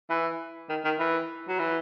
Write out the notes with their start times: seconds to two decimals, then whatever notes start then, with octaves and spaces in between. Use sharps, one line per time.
0.10 E3
0.69 D#3
0.84 D#3
0.99 E3
1.48 F#3
1.59 E3